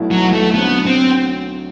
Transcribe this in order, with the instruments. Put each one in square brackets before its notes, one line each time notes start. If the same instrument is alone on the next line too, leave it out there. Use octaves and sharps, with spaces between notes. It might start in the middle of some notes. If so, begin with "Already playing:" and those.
Already playing: [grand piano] B1 B2 A3 E4
[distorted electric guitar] F#3
A3
[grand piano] D3 F#3 C4 [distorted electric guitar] B3
[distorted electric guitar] C4